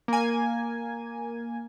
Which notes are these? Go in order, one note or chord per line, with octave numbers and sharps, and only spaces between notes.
A#3 G#5